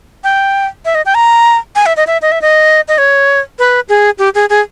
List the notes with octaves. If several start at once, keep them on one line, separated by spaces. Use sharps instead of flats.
G5
E5
D#5
G5
A#5
G#5
E5
D#5
E5
D#5
E5
D#5
D#5
C#5
B4
G#4
G4
G#4
G#4